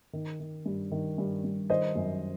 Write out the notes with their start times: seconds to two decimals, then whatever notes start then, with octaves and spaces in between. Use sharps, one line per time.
0.13 D#3
0.40 D#3
0.66 G2
0.91 D#3
1.18 G2
1.44 G2
1.70 D#3 C5 D#5
1.96 F#2